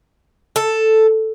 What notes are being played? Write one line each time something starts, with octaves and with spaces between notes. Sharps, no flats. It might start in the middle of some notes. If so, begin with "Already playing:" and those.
A4